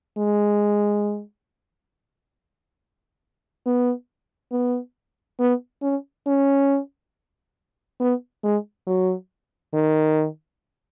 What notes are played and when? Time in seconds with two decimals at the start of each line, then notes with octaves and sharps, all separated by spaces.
0.18 G#3
3.66 B3
4.52 B3
5.40 B3
5.82 C#4
6.26 C#4
8.00 B3
8.44 G#3
8.87 F#3
9.74 D#3